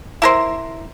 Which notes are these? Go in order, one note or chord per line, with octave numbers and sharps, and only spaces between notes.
E4 A#4 C5